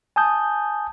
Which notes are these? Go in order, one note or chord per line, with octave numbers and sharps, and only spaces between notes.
G#5 A5 D#6 G6